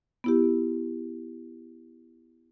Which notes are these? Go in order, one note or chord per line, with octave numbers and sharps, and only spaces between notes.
B3 E4 G4